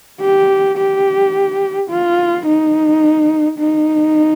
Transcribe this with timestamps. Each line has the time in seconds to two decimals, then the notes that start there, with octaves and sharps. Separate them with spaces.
0.21 G4
0.78 G4
1.90 F4
2.46 D#4
3.59 D#4